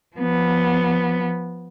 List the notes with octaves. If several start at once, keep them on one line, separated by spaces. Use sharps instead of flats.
F3 B3